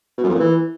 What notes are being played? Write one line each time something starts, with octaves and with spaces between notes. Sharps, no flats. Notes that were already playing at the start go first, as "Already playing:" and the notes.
B2
F#2
F2
A#2
E3